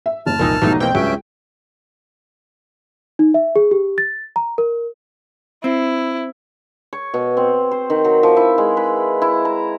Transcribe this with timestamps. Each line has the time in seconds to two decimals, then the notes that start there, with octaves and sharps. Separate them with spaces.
0.06 E5
0.26 F#1 A5 F6
0.39 C2 F2 A#2 E3 D#4 A#4 G#5 E6
0.62 F1 B1 E3 F#3 G3 A3 D#4
0.80 B2 E3 A#3 C4 G5
0.95 C#2 G2 F#3 C#4 E5
3.19 D#4
3.34 E5
3.56 G#4
3.71 G4
3.98 A6
4.36 A#5
4.58 A#4
5.64 C4 E4
6.93 C#5
7.14 B2
7.37 C4
7.71 C5
7.90 D#3
8.05 F#3
8.23 F3
8.37 E4
8.58 G#3
8.77 B4
9.22 E4
9.45 A#5